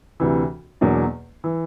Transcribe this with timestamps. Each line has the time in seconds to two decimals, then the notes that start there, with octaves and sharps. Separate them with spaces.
0.20 D2 C3 E3
0.81 E2 B2 F#3 A#3 D4
1.44 E3